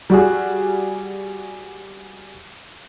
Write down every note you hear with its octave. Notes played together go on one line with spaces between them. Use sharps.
G3 F#4 G#4